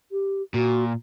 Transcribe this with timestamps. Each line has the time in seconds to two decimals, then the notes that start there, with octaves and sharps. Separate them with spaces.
0.12 G4
0.54 A#2 F#4